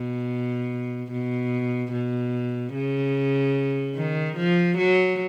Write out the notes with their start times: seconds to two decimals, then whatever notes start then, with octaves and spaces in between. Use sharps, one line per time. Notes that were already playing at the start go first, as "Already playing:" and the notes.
Already playing: B2
1.12 B2
1.93 B2
2.74 C#3
3.96 D#3
4.37 F3
4.77 F#3